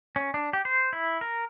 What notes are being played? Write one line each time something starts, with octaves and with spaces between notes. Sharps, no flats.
C#4
D4
G4
C5
E4
A#4